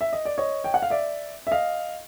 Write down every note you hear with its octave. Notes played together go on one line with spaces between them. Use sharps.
E5
D#5
D5
C#5 D#5
G5
F#5
F5
D5 E5
E5
D#5 F5